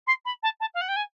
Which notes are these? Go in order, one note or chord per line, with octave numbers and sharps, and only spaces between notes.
C6
B5
A5
A5
F5
F#5
G5
G#5